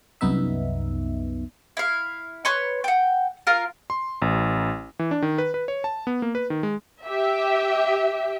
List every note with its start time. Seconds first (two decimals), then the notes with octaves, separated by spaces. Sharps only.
0.21 C2 F#2 B3 D#4 E5
1.77 E4 F5
2.45 B4 C#5 C6 C#6
2.84 F#5 G5
3.47 F4 A#4 F5
3.90 C6
4.22 A1
4.99 E3
5.11 D4
5.22 D#3
5.38 B4
5.54 B4
5.68 C#5
5.84 A5
6.07 B3
6.22 A#3
6.35 B4
6.50 D#3
6.63 G#3
7.05 G4 E5